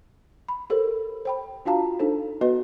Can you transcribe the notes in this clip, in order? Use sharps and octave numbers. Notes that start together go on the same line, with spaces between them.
B5
G4 A4 A#4 C5
C5 G5 B5
D4 F4 F#4 F5 A5 A#5
D4 D#4 A4 C5
B3 F#4 B4 D#5